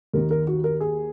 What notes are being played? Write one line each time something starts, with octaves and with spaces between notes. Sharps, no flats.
D#2 D#3 A#4
A#4
F#4
A#4
G#4